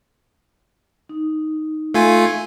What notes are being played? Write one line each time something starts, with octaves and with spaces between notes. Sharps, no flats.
D#4
A3 F4 G#5